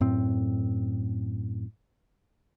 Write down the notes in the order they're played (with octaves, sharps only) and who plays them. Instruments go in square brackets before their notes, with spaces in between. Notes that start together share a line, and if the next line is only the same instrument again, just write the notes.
[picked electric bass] F#2 A2 C4